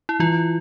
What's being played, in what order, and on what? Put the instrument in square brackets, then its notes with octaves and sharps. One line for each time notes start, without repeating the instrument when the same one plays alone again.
[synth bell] E4
[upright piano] E3 [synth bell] F4